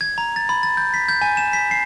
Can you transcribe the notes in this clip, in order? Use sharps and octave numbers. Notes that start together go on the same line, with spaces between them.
G#6
A#5
A6
B5
A6
G6
B6
G6
G#5
E7
B6
C7